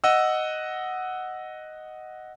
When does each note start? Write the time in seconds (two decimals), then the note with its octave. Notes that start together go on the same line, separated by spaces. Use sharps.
0.04 D#5 F#5 E6